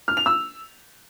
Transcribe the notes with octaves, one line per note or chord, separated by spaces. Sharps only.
F6
F7
E6